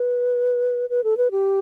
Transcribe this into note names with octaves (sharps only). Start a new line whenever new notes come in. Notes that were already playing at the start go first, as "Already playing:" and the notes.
Already playing: B4
B4
A4
B4
G4